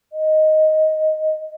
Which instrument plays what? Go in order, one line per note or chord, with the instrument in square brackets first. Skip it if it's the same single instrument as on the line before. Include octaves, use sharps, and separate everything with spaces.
[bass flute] D#5